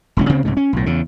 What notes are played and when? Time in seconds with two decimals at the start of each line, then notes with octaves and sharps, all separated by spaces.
0.17 E1 C#2 C#4
0.29 D2 C#3 C4
0.45 C2 G#2 C#3
0.57 C#4
0.73 B1 A2
0.86 E2 C#3